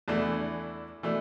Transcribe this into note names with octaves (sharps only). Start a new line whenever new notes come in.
E2 E3 A3 D4
E3 A3 D4